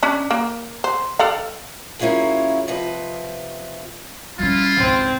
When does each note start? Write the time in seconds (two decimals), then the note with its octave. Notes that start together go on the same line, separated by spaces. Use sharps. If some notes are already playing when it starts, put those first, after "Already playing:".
0.03 C#4 D4
0.31 A#3
0.84 C5
1.19 A4 D5 F5
1.99 F#3 A#3 C#4 E4 F4 G#4
2.68 C3 F3 B4 D#5
4.39 G3 C#4 E4 F4
4.77 G#1 C#2 C4